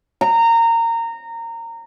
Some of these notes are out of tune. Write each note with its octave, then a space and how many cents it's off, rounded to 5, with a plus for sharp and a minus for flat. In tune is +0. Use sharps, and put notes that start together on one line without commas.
A#5 -20